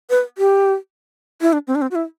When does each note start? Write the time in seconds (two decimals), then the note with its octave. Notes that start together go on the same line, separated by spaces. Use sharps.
0.10 B4
0.38 G4
1.41 E4
1.53 D4
1.67 C4
1.75 D4
1.82 C4
1.91 F#4
1.95 E4